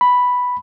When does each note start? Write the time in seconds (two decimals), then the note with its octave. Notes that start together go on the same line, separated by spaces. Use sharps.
0.01 B5